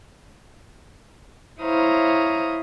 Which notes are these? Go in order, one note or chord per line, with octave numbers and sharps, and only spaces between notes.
E4 C5 C#5 F5 A#5 D#6